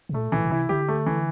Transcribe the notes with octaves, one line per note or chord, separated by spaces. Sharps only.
C3
A#2 A3
A#2 E3
A#2
C3 E4
D3 G4
A3
E3